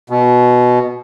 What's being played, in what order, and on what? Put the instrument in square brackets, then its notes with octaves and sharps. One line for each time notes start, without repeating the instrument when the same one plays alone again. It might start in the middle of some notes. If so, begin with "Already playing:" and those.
[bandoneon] B2